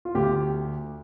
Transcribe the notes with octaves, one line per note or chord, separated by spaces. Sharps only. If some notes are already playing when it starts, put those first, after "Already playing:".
F4
D2 G4